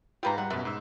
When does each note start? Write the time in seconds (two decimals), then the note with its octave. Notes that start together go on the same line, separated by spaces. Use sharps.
0.23 G#2 F4 G4 B4 A#5
0.38 G3 F#5
0.50 F#2 B2 B4 E5
0.65 G#2 E6